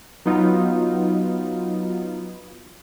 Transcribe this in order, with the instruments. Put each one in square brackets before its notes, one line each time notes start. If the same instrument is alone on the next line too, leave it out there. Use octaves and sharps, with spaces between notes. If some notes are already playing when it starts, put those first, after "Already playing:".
[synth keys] F#3 B3 D#4 F4